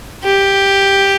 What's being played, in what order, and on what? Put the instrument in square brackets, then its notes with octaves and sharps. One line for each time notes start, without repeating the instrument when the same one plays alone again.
[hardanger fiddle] G4